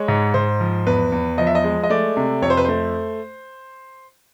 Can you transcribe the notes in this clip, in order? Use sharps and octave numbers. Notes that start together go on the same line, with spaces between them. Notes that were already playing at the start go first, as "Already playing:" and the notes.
Already playing: G#3 C#5
G#2
G#2 C5
F3
E2 B4
E2
F3 D#5
E5
D#5
G#3
D#5
A3 D5
C3
F2 C#5
C5
B4
A3 C5